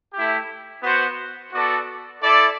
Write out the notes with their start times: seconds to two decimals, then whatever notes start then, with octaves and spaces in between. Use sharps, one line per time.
0.13 A3 E4 G4
0.82 B3 F#4 C5 F#5
1.53 B3 F#4 A4 D5
2.22 E4 A4 D5